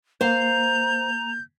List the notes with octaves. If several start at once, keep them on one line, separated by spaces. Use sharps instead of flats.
A#3 C5 F5 A#5 G6